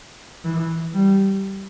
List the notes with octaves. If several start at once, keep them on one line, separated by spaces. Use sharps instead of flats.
E3
G3